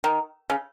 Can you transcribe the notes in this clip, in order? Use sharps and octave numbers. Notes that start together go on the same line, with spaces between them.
D#3
C#3